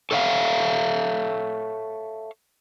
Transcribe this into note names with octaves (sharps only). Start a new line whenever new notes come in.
A4 C#5 E5 F5